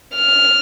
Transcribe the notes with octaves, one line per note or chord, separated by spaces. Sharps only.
F6